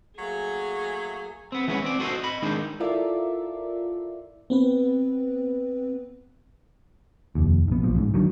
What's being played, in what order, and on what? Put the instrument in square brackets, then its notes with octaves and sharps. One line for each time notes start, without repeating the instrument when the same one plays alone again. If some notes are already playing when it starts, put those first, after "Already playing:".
[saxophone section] F#3 A3 A#3 [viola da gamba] G#4
[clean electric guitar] B3 C4
E3 G#3 A3 B3 C#4
C4 D5
F#4 A4 C5 D#5
D#5 B5
D#3 G#3 C4 D4 D#4
[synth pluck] E4 F4 A4 A#4 D5 E5
[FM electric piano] B3 C4 B4
[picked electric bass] F1 D#2
A#1 B3
B1 A#2 F3
A1 G#2
D3 D#3 F#3